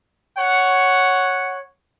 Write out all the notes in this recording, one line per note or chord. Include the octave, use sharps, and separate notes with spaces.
C#5 F#5